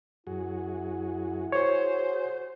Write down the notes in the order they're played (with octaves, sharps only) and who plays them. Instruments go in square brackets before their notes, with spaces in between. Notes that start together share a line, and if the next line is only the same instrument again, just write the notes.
[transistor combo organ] F#2 F#4 G#4 [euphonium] E4
[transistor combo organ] F#4 G#4 [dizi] C5 [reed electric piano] C#5